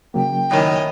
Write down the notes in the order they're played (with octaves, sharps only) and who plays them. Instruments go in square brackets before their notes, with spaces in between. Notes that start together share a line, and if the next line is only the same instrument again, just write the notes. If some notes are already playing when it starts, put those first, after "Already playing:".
[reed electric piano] C#3 F#3 A#3 [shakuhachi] G5
[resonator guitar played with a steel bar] F#2 A2 D#3 [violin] C#5 D#5